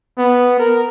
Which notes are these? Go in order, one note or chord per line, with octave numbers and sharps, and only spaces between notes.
B3
A#4